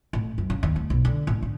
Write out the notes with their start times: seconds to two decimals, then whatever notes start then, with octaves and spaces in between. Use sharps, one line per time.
0.13 A1
0.38 F#2
0.50 C#3
0.63 D#2
0.76 D2
0.90 B1
1.05 D3
1.27 A1
1.42 D3